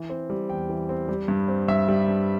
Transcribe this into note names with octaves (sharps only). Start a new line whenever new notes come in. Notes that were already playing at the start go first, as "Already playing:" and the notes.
Already playing: E3
C4
G3
E2 G5
E3
C4
G3
G2
C4
G2 E5
G3
G2